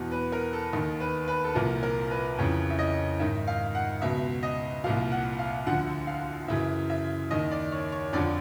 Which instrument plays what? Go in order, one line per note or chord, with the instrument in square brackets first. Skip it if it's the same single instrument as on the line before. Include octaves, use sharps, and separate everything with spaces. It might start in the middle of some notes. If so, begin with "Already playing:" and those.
Already playing: [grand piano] E2 B2
B4
A#4
A4
D#2 D#3
B4
B4
A4
C2 A#2 F3 A#4
A#4
B4
F2 C#3 E3 C#5
E5
D#5
G#2 D#3 E5
F5
F#5
C#2 B2 E5
D#5
C2 A#2 F3 F5
F#5
F5
D2 D3 F3 F#5
F5
F#2 C#3 E3 E5
E5
D#2 D#3 D#5
D5
C#5
C#5
F2 D3 F3 D5